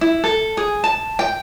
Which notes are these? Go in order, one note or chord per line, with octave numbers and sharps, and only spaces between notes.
E4
A4
G#4
A5
G5